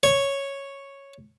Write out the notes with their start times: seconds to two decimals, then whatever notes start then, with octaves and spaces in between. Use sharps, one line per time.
0.03 C#5